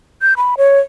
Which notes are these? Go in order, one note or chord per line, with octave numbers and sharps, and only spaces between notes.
G6
B5
C#5